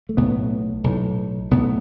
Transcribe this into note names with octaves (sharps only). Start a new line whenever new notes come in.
A3
B1 A2 B3
B1 A2
B1 A2 B3